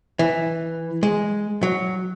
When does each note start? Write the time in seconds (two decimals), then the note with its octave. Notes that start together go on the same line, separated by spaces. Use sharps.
0.19 E3
1.03 G#3
1.63 F#3